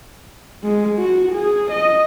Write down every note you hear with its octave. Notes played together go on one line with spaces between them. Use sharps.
G#3
F#4
G#4
D#5